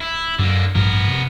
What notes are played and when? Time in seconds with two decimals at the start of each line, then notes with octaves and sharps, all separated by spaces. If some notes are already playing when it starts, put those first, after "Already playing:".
0.01 E4
0.39 F#2 D3 A#3
0.75 A1 G2 F3 B3 A#4
1.08 C3